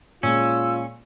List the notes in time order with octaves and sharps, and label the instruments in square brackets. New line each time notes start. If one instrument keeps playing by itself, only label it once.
[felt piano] A#2 G#3 [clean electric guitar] C#4 [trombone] F4 [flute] E6